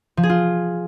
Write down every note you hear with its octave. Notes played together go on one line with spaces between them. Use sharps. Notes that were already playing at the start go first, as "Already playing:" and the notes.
F3
G#4
F4